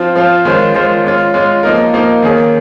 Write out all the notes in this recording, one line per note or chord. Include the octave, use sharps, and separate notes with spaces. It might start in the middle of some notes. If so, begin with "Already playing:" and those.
Already playing: F3 C4 F4 C5
F3 C4 F4 C5
D#3 G#3 C#4 F4 C5
D#3 G#3 C#4 F4 C5
G#3 C#4 F4
G#3 C#4 F4
F3 A#3 D#4 A#4
F3 A#3 D#4 A#4
D#3 A#3 C#4 G#4